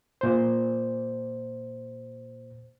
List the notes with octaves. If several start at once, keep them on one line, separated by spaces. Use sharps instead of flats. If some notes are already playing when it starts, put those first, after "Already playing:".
A#2 C5